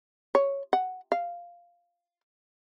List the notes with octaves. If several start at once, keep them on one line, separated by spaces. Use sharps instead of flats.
C#5
F#5
F5